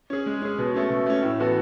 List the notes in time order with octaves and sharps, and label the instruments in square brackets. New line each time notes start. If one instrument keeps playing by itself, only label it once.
[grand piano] C#4 G#4
G#3
C#4 G#4
B2
A3 C#4
B2
A3 C#4
A2
E3 B3 F#4 A4